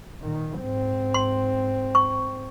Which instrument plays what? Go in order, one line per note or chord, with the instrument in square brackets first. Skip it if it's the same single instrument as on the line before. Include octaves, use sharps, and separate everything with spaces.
[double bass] A#2 D#3
G#2 C4
[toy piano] C6
C#6